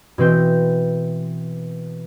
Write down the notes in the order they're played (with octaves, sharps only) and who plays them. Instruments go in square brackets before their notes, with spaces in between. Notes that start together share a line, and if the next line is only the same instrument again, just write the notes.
[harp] B2 E3 C4 G6